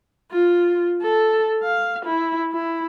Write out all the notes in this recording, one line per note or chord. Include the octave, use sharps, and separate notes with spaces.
F4
A4
F5
E4
E4